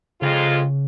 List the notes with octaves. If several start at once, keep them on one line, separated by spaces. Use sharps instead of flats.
F2 C#3 G#3 F4